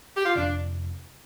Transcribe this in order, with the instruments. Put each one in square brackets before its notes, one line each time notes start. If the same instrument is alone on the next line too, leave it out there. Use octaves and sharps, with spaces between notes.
[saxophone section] G4
F4
[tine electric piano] G1 F2 C3 [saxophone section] D4